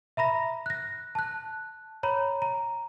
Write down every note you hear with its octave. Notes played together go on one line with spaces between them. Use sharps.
E5 A#5 B5 A#6
F#6 A#6
A5 F#6
C#5 A#5 B5
A#5